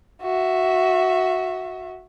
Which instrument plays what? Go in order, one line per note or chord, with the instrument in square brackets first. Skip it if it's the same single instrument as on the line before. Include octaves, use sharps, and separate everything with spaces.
[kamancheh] F#4 E5